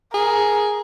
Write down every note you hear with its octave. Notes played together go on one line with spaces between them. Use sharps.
G#4 A#4